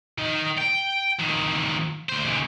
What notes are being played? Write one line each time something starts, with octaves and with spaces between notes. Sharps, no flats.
D#3 D#4
G5
F2 D#3
D2 C5
D#2 C#3